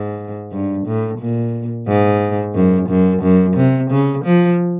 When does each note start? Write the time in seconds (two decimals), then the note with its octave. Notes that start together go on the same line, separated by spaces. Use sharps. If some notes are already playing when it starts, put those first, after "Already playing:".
Already playing: G#2
0.52 G2
0.87 A2
1.19 A#2
1.88 G#2
2.55 F#2
2.90 F#2
3.22 F#2
3.57 C3
3.91 C#3
4.25 F3